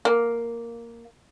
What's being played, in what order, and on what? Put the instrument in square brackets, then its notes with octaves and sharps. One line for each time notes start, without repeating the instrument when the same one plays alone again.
[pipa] A#3